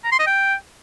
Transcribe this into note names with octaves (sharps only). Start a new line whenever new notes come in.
A#5
C6
D#5
G5